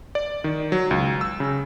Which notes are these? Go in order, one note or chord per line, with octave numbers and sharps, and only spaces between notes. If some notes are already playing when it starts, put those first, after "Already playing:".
D5
D#3
F#3
C#2
E6
C#3